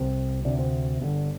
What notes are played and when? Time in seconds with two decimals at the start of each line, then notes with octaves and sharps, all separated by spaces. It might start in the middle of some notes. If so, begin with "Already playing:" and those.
Already playing: C2 C3 C4
0.45 D2 C3 D4
0.59 C4
1.01 G1 G2 D3